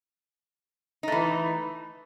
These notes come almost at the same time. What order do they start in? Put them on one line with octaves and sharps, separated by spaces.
D#4 A3 E3